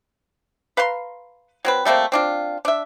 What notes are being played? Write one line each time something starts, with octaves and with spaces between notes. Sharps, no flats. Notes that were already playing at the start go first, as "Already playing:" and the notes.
B4 F5 A#5 C6
F#3 C4 B4
G3 A3 A#3 C4
C4 D4 F4
D4 E5